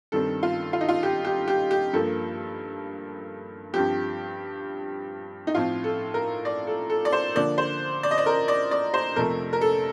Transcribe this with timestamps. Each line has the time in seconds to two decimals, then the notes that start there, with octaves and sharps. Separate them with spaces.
0.12 G2 D#3 G3 C4 A4
0.43 F4
0.73 F4
0.81 D#4
0.88 F4
1.03 G4
1.25 G4
1.48 G4
1.71 G4
1.93 G2 F3 A#3 A4
3.73 G2 F3 C4 G4
5.47 D#4
5.55 A2 F3 C4 F4
5.84 A4
6.14 A#4
6.45 D5
6.67 A4
6.90 A4
7.05 D5
7.12 C5
7.35 D3 F3 A#3 D5
7.58 C5
8.03 D5
8.11 D#5
8.18 D5
8.26 A#4
8.48 D5
8.71 D5
8.94 C5
9.16 F2 C3 F3 A3 C4 A#4
9.53 A#4
9.61 A4